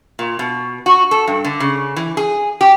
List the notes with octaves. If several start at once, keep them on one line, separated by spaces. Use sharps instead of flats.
A#2
B2
F#4
A4
G2
D3
C#3
E3
G#4
G4